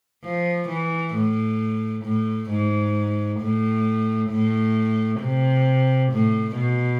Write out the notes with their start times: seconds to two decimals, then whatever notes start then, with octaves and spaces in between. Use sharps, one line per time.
0.24 F3
0.68 E3
1.15 A2
2.04 A2
2.50 G#2
3.40 A2
4.30 A2
5.21 C3
6.12 A2
6.56 B2